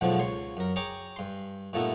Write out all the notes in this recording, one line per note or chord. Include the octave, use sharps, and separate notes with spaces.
E2 G#2 B2 D3 F3 F#3
C#2 C#5 C6
F#2 A#4
G#4 C#5 G5 A#5 D6
G2 C6
G2 A#2 A3 B3 D#4 E4